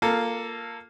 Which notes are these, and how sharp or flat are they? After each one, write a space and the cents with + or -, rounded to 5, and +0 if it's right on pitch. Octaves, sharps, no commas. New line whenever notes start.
A#3 +0 F4 +0 A4 +15